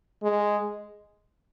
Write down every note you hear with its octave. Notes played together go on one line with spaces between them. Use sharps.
G#3